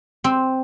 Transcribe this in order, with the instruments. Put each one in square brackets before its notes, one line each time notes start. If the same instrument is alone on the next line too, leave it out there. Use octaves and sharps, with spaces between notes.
[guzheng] C4